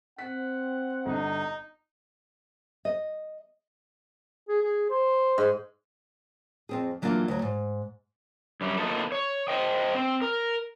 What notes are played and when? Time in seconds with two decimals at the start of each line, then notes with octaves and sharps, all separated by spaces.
0.19 C4 F#5 B6
1.06 G1 D4 D#4
2.85 D#5
4.49 G#4
4.62 G#4
4.90 C5
5.38 G#2
6.69 F2 C4 G#4
7.02 E3 F#3 A#3 D4 F4 F#4
7.28 D2 F#3
7.42 G#2
8.61 F#2 G3
8.78 A#3 B3 D#4 F4 A4
9.12 C#5
9.48 C5 D#5 G5
9.95 C4
10.22 A#4